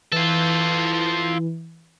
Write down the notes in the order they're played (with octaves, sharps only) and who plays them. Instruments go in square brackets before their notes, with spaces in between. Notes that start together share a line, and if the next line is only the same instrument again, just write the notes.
[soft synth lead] E3 [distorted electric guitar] F4 A4